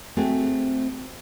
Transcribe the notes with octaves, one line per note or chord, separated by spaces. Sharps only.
A3 C4 F#4 G#4 C5